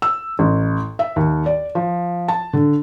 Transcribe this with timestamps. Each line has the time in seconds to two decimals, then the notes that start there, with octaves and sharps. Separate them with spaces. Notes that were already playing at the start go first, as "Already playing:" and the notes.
0.02 E6
0.39 A1
0.99 E5
1.16 D#2
1.46 D5
1.75 F3
2.28 A5
2.53 D3